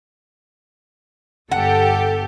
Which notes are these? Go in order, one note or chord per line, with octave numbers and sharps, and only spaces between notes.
G1 G4 A4 F#5